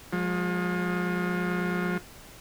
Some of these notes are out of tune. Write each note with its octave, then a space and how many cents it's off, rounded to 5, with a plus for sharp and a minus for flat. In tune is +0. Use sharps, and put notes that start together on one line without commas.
F3 +35 G#3 +0